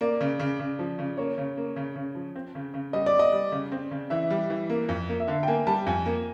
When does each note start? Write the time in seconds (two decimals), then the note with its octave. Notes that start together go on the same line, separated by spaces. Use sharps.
0.01 A#3 D5
0.21 C#3
0.40 C#3
0.60 C#3
0.79 F3
0.99 C#3
1.17 A#3 C#5
1.38 C#3
1.57 A#3
1.76 C#3
1.96 C#3
2.15 F3
2.36 C4
2.55 C#3
2.74 C#3
2.93 G3 D#5
3.06 D5
3.14 G3
3.19 D#5
3.32 G3
3.52 C#3
3.72 C4
3.91 C#3
4.10 E3 E5
4.30 G3
4.50 E3
4.70 A#3
4.89 F2
5.09 A#3
5.20 E5
5.28 D3 F5
5.43 G5
5.47 A#3 G#5
5.67 G3 A5
5.86 F2 G#5
6.06 A#3